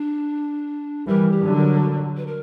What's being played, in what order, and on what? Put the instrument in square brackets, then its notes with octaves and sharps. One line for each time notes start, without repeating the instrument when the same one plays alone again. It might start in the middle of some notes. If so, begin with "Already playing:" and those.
Already playing: [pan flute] D4
[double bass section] E3 G3 [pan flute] A#4
[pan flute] G4
[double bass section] D3 F#3
[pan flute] A#4
F#4
B4
A#4